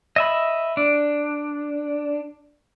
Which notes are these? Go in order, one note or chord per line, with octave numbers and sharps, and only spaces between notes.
D#5 E5 B5
D4